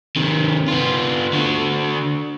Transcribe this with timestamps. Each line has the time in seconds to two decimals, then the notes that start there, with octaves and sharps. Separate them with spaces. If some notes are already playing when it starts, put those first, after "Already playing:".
0.16 C3 D#3
0.68 B3 F4
1.33 D3 F#4